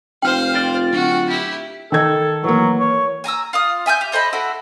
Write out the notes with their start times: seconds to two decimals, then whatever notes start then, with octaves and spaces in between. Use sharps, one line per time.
0.22 F1 C5 F5 G5 F6
0.55 F4 D5
0.92 D1 F#4
1.27 E4 G4
1.92 D#3 A4 G#6
2.44 E3 F#3 A#3
2.79 C#5
3.24 G#5 A#5 D6 E6
3.53 F4 F5 D#6
3.86 E5 G#5 E6 G6
4.01 G4
4.12 A4 C5 D#5 B5
4.33 E4 F#4 A4